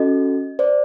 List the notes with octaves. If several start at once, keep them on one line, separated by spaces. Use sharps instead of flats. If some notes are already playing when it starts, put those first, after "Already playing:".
Already playing: C#4 F#4 A4 D#5
C5 D5